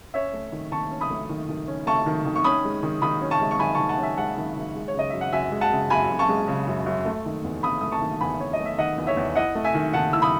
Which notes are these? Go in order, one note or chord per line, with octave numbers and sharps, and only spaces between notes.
C#4 C#5 E5
A3
D#3
D#3 A5 C#6
C#4
B5 D#6
A3
D#3
D#3
C#4
A3 A5 C#6
D#3
D#3
C#6
C#4 B5 D#6
G#3
D#3
D#3 B5 D#6
C#4
A5 C#6
G#3
C#6
D#3 G#5 B5
D#3 A5 C#6
F#5 A5
C#4 E5 G#5
G#3 F#5 A5
D#3
D#3
G#3
C#5
C#3 D#5
F#2 E5
F#5
F#2 E5 G#5
G#3
F#5 A5
C#3
F#2 G#5 B5
F#2
A5 C#6
G#3
C#3
F#2
F#2
A3
D#3
E2
E2 B5 D#6
A3 D#6
A5 C#6
D#3
E2 G#5 B5
E2 C#5
D#5
A3
E5
D#3 D#5 F#5
E2
C#5 E5
E2
E4 D#5 F#5
A3
E5 G#5
D#3
D#3 F#5 A5
E4 E6
B5 D#6